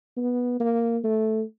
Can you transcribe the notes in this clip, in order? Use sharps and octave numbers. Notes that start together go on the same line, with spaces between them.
B3
A#3
A3